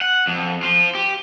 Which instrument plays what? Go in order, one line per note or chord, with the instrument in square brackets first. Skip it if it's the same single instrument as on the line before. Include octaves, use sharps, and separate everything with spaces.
[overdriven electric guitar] F#5
F2
F4 C5
G4